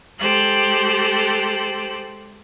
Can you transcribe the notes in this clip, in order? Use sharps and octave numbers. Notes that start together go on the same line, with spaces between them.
G#3 G4 A4 C5 F#6